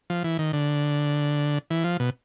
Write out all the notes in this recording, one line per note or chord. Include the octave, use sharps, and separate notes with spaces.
F3
E3
D#3
D3
E3
F3
B2